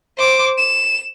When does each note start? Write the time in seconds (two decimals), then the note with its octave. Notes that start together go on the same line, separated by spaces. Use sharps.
0.18 C5 D6
0.58 E7